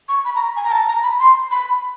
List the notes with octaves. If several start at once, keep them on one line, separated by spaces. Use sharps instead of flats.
C#6
B5
A#5
G#5
A#5
A5
A#5
B5
C6
B5